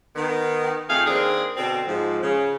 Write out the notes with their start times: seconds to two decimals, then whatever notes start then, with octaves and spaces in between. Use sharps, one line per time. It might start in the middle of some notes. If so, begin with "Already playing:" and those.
0.16 D#3 B3
0.90 F2 A3 D#4 G#4 F5
1.07 D#3 A#3 C4 D4 G#4
1.57 B2 D3 C4
1.88 G#2 F3
2.23 C#3